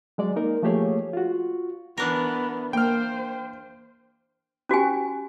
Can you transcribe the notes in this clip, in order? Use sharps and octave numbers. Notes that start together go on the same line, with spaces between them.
F#3 G#3 D5
A#3 D#4 A#4
F3 A3 A#3 G4 G#4 C#5
F4 F#4
E3 B3 D4 A#4
A#3 C5 G5 F6
C#4 F#4 G4 G#5